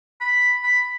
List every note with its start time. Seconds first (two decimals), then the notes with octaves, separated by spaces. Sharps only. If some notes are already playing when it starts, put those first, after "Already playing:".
0.21 B5
0.64 B5